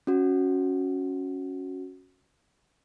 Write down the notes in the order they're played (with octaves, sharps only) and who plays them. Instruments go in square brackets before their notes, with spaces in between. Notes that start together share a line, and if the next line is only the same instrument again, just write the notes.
[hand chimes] C#4 F#4